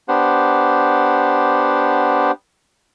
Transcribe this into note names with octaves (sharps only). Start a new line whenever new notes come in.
B3 D4 G4 C5 F#5